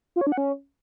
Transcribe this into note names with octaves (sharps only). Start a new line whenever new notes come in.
F4
C#5
D4
F#5
C#4